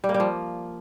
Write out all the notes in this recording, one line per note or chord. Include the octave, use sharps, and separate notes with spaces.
G3
A#3
G3
F3